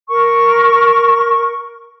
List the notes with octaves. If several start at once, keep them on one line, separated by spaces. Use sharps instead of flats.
A#4 C#6